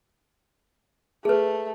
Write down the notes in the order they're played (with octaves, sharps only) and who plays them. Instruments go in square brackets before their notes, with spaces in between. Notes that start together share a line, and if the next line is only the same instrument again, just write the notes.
[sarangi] A3 [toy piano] G#4 B4